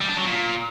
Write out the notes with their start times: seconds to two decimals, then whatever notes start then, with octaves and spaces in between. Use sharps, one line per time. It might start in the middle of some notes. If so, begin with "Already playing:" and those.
0.01 G3
0.09 D4
0.17 F#3
0.25 A#2